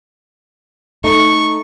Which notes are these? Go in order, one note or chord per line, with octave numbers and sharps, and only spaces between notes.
A3 D#4 C#6